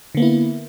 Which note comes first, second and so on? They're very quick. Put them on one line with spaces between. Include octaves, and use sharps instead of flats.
D3 A#3 B3 E4